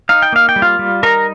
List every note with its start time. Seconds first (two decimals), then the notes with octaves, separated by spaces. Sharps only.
0.09 D#4 F5
0.22 G5
0.33 A#3 F5
0.49 G5
0.56 G3
0.62 F4 F5
0.79 G3
1.03 D#4 A#4 A#5